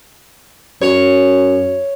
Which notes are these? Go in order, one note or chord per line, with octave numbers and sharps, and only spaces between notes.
F#2 C#5